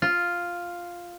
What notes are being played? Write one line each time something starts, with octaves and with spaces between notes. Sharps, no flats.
F4